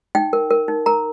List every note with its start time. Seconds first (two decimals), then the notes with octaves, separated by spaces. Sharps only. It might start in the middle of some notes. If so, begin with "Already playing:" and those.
0.15 D#4 G5
0.33 A#4
0.50 A#4
0.68 D#4
0.86 A#4 A#5